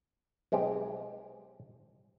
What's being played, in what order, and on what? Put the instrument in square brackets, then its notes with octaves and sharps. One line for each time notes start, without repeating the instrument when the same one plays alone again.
[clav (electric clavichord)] B1 G#3 C4 G4